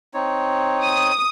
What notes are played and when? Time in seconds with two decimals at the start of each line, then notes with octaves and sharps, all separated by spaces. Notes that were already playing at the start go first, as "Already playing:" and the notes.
0.14 C4 D#4 C#5
0.83 D#6